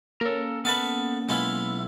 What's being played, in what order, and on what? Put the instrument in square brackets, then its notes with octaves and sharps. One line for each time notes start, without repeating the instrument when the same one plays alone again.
[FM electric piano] A#3 C#4 [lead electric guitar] A4 A#4
[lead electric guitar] B3 A4 [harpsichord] B4 E5 F5
[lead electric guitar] B1 E4 [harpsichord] G#3 B3 F4